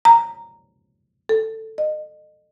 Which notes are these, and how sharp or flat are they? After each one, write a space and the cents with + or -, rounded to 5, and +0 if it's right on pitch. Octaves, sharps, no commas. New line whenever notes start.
A#5 -10
A4 +5
D#5 -30